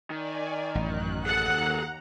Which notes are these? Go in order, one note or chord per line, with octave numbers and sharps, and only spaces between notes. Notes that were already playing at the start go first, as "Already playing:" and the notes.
D#3 D5 G#5
A1 F#2 F#6
D#2 G#4 A4 F#5 A#5